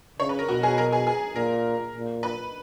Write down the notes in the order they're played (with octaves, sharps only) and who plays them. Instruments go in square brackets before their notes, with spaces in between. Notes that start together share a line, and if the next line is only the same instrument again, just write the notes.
[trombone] C#3 [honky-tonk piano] C#5
[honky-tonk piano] B4
A#4
[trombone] B2 [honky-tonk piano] F#4
[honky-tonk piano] G#4
A#4
G#4
G#4
[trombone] A#2 [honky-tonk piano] A#4
[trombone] A#2
[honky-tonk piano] B4